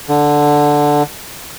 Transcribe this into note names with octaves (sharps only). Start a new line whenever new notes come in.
D3